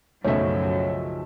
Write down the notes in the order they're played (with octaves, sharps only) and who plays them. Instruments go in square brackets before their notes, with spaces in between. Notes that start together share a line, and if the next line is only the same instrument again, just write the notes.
[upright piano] B1 A3 E5 [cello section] F#2 F#3 [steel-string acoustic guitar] C#3 F3 [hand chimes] C#5